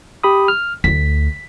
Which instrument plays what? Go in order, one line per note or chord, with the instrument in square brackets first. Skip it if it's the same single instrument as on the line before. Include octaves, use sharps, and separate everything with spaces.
[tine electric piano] G4 B5 D#6
F6
[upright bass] D2 A3 [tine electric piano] B6